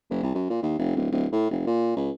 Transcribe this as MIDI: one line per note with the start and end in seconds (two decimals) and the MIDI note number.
0.10 0.20 30
0.23 0.30 36
0.35 0.48 42
0.50 0.60 46
0.62 0.78 39
0.79 0.95 29
0.96 1.09 26
1.12 1.26 26
1.32 1.50 45
1.51 1.63 29
1.67 1.94 46
1.97 2.10 37